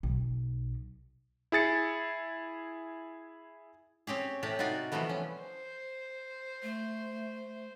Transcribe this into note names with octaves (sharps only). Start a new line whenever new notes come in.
B1
E4 G#4 A6 C#7
C4 C#4 G4 G#4
A2 C3 G4 D5 A5
D#4 F4 F#4 D5 G#5
C3 E3 F3 G3 A3 B3
C#4
C5
A3